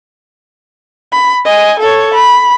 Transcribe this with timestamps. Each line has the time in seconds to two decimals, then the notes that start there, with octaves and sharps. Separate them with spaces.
1.12 B5
1.44 D#5 G#5
1.79 A4 C#5
2.14 B5